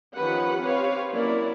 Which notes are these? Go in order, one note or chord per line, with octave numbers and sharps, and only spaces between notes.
D#3 F3 C#4 G4 B4 F#5
C4 G4 B4 C#5 F5
F#3 A#3 C#4 E4 A#4 D5